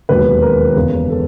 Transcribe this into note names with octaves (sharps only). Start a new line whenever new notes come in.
E1 D#2 D#3 F#3 B4
A#4
F#1 E2 C#3
A4